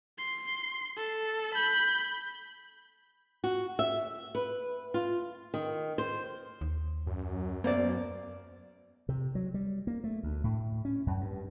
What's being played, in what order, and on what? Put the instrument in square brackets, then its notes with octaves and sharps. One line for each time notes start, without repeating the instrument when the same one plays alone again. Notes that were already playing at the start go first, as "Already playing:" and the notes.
[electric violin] C6
A4
B5 G6
[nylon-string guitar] F#4
E5
B4
F4
D#3
C5
[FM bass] D#2
[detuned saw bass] F#2
[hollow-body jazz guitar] A#3 C5 D5 [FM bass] B3
[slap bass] C3
F#3
G3
A#3
A3
D2
A2
C#4
F#2
G2